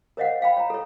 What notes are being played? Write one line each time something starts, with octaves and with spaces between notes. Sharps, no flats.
A#4 C5 C#5 D#5 F5 F#5
C5 F5 G5 B5
C#5 A#5
A4 C#5